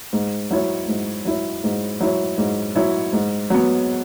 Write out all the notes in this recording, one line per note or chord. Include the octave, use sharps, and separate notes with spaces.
G#2
F#3 E4 C#5
G#2
F#3 E4 C#5
G#2
F#3 E4 C#5
G#2
F#3 E4 C#5
G#2
F#3 B3